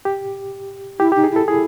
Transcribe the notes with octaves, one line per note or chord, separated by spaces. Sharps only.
G4
E4 G4
D#4 G4
G#4
E4 A4
E4 G#4